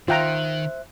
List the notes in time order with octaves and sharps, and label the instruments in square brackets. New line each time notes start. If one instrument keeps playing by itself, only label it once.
[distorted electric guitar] D#3 [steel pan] F4 G5 A#5 [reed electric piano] C5 E5 F#6